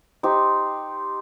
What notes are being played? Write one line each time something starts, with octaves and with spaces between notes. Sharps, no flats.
D#4 G4 C5